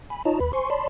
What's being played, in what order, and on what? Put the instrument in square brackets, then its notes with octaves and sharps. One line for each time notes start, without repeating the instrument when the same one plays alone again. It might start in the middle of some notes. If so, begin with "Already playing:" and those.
[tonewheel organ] G#5 B5
D#4 F4 C#5 D#5 A5 A#5
D#2 B4 B5
C5 G#5 C6 C#6
C#5 D5 A5 B5 C6